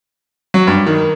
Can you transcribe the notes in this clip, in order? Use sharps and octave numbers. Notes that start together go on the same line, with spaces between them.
F#3
G2
D#3